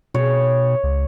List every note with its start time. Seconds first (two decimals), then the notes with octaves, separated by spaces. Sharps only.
0.14 B2 C#5
0.83 C#2